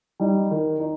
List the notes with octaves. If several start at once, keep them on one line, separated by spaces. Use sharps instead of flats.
G3 D#4
D#3
D#4